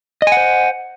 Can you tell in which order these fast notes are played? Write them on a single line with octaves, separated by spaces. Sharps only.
D#5 G#5 F#5 C5